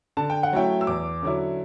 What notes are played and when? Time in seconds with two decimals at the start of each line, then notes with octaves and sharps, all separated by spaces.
0.17 D3 A5
0.30 G5
0.43 F#5
0.53 F#3 A3 C#4 E4 G5
0.81 E6
0.87 E2 D6
1.23 D3 F#3 C#4 E4